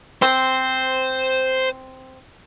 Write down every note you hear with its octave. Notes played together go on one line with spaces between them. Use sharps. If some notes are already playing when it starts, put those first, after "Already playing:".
C4 C5